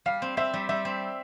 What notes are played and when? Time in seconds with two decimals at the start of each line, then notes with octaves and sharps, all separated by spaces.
0.06 G3 F5
0.22 C4
0.37 C4 E5
0.53 G3
0.69 G3 E5
0.85 C4